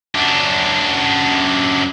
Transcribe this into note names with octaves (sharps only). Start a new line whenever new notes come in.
F#2 D4